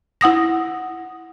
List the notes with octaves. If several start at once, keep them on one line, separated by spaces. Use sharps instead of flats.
E4 F#5 D#6 A#6